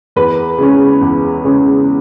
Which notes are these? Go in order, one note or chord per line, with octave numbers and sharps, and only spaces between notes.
E2 B4
C#3 G#3 C#4
E2
C#3 G#3 C#4